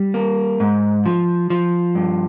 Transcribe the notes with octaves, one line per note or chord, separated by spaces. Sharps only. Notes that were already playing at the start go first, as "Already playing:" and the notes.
Already playing: G3
A#3
G#2
F3
F3
G2